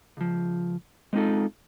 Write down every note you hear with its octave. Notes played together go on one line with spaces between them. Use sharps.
C#2 F3
G#3 B3 C4 D#4 F4 A4